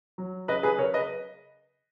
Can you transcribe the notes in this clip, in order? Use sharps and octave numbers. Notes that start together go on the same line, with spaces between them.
F#3
C#3 B4 D#5
G#4 B4
C#3 A#4 C#5
B4 D#5